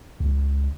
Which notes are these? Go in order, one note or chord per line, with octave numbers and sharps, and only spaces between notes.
C#2